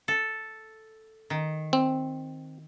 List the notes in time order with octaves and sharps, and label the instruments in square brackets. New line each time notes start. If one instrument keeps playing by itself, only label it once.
[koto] A4
D#3
[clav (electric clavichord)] C4